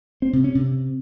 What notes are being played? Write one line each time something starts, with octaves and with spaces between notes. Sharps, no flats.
C4
C3
C#4
C3